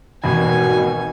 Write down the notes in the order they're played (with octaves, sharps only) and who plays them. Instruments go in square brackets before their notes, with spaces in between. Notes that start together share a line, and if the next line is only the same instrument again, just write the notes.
[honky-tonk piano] G#1 D#2 [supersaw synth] B2 [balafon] E3 [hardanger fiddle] G#5